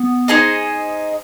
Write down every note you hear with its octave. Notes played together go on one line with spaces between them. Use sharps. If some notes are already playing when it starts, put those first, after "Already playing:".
Already playing: B3
D#4 G#4 C5 D#5